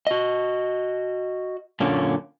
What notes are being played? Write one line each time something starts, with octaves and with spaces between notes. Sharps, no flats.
F#4 D#5
F#2 A#2 D3 A#3 C#4